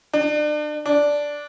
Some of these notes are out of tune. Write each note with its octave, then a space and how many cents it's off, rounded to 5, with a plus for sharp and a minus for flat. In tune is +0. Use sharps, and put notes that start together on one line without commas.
D4 +35
D4 -5